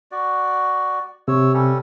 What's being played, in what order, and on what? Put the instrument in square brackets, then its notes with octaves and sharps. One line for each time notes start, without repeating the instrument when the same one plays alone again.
[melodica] F#4 D5
[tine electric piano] C3 [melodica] C#5 E6
[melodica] G3 C#4 A4